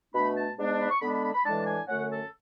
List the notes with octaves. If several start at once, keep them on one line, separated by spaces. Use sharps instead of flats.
B2 A3 D4 B5
A5
G#2 G#3 B3 D4
A5
B5
C#6
D3 G#3 B3 D4 B5
B5
B5
B5
A2 E3 G#3 D4 A5
G#5
F#2 D3 A3 C#4 F#5
A4